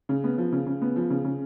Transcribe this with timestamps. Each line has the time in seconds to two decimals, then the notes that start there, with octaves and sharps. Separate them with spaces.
0.09 C#3
0.24 B3
0.38 F3
0.52 C#3
0.66 C#3
0.82 B3
0.96 F3
1.10 C#3
1.24 C#3